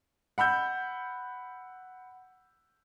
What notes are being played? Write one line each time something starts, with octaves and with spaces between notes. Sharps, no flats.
F#5 B5 E6 G6